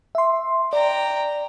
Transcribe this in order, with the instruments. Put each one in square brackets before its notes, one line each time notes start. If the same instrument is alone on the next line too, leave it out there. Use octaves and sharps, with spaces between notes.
[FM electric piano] E5 C6
[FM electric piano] D5 [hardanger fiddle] G5 A#5